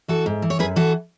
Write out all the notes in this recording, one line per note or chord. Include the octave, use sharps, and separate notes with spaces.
E3 F#4 A4
G#2
E3
C#5
F#2 G#4 B4
E3 F#4 A4